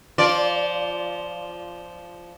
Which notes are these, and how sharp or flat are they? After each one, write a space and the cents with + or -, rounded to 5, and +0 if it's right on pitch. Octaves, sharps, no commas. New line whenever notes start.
F3 -10 F4 +0 D5 -15